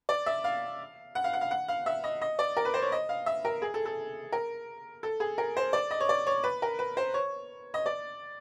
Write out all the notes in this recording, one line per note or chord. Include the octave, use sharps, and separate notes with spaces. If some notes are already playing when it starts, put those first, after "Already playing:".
D5
E5
F5
F#5
F5
F#5
F5
F#5
F5
E5
D#5
D#5
D5
A#4
B4
C5
C#5
D#5
F5
E5
A#4
G#4
A4
A4
A#4
A4
G#4
A#4
C5
D5
D#5
C#5
D5
C#5
B4
A#4
B4
C5
C#5
D#5
D5